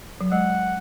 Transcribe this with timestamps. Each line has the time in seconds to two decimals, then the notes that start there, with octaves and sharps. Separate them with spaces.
0.21 F#3
0.32 G#3 F#5